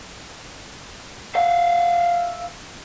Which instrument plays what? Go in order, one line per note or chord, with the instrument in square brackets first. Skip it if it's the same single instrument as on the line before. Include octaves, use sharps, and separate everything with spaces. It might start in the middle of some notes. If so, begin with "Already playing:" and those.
[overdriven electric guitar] E5 F5